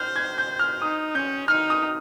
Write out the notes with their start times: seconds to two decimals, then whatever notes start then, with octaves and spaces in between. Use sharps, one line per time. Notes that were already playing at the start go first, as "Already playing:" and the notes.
Already playing: C5 F6 G6
0.16 G#6
0.38 G6
0.59 F6
0.81 D#4 D#6
1.15 C#4 G6
1.48 D#4 F6
1.70 D#6